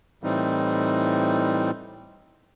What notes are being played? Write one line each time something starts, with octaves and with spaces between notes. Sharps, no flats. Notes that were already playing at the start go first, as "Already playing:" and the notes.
A2 E3 G3 C4 D#4